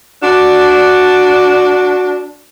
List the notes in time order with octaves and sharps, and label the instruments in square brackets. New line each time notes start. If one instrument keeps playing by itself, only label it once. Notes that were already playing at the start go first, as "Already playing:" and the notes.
[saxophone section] D4 F#4